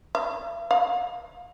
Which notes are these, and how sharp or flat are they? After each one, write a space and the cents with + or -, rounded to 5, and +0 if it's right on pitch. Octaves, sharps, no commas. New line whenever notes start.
F5 -45
F5 +30